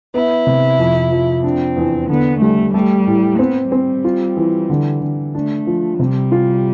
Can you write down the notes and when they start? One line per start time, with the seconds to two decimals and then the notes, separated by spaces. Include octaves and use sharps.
0.14 B3 E4
0.47 C3
0.79 F2
1.12 F3
1.44 C4 D4
1.77 E2
2.09 D3 B3
2.42 G3 A3
2.74 G3 A3
3.07 A2
3.39 B3 C4
3.72 G3 C4
4.04 F4
4.37 E3
4.70 D3
5.01 D3
5.35 A3 D4
5.67 F3
5.99 C3 G3
6.32 F4